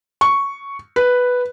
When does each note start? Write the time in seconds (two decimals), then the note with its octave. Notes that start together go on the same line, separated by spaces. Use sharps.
0.21 C#6
0.96 B4